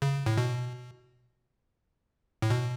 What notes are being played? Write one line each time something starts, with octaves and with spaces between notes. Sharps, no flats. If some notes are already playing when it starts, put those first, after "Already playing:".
C#3
A2
B2
A2
B2